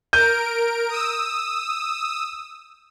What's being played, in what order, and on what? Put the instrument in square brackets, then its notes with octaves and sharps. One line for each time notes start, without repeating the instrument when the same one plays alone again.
[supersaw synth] A#4 D7 [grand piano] G6 D#7
[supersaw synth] D#6 E6